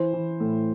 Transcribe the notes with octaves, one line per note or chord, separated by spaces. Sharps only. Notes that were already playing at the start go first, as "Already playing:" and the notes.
Already playing: E3 C5
E3
A2